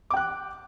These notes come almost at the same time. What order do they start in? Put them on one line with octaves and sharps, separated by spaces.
D6 G5 F#6